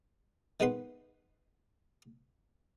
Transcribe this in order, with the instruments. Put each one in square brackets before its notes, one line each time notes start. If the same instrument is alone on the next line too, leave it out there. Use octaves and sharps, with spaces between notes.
[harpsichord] D#3 G#3 B3 B4 C6